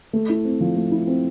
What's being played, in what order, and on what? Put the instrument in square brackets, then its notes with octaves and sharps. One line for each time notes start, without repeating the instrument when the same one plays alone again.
[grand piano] A3
E4
C4
F3
A3
E4
C4